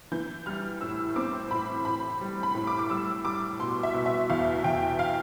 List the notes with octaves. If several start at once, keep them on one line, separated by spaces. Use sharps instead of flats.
E3 G6
G3 F6
A2 E6
C4 D6
A2 B5
A2 B5
G3
B5
A2
D6
D6
G3 E6
G3 D6
B2 C6
E5
B2
E5
E2 F5
E2 G5
F5